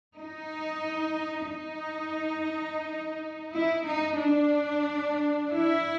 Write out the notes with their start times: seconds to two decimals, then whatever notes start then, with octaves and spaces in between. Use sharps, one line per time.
0.18 D#4
1.51 D#4
3.51 E4
3.85 D#4
4.18 D4
5.51 E4